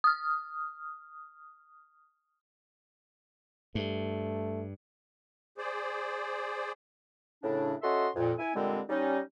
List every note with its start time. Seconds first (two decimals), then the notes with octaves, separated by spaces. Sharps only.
0.04 D#6 F6
3.75 G2 A3
5.58 G#4 C5 D5
7.43 A2 C#3 D4
7.82 C#4 F#4 A4 D#5 E5 C6
8.16 F2 A#2
8.39 E4 G#5
8.54 A#2 D3 G3 G#3 C4
8.89 G3 C#4 D#4